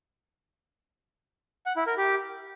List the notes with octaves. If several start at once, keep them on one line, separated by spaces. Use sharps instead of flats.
F#5
E4
A#4
G4